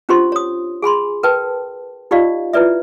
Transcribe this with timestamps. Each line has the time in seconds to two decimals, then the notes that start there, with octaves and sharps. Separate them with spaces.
0.09 C#4 D4 F4 G4 C5 C6
0.32 C#5 D#6
0.82 G#4 G#5 B5 C6
1.23 A#4 B4 G5 A5
2.11 D#4 F4 G4 D5 D#5 F5
2.53 E4 F4 B4 D5 E5